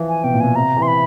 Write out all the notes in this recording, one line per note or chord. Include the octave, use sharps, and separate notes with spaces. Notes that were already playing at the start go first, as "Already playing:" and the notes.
Already playing: E3 F3
G#5
B2 G5
A#2
B2 G#5
C3 A#5
E3
C6
B5